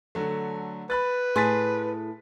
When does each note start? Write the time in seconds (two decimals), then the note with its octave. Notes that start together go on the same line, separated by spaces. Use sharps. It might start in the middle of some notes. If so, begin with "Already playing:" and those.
0.15 D3 F#3 A3
0.90 B4 B5 F#6 A6
1.36 A2 G#4 C6 A6 B6